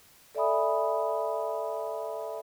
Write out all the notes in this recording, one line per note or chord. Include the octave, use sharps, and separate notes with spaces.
A4 D5 E5 G#5 B5 D#6